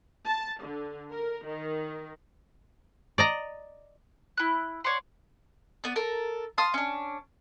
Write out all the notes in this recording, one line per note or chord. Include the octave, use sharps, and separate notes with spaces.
A5
D3
A#4
D#3
D5 D#5 A#5
E4 F#6
C#5 D5 F#5 C6
B3 D5
A4 A#4
F5 A5 C6 D#6
C#4 D4